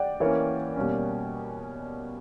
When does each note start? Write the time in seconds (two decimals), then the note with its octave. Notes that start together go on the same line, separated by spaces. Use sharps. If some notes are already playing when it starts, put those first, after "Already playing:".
Already playing: D5 F#5 G5
0.20 E3 A#3 C#4 A#4 C#5
0.76 B2 G3 A#3 C#4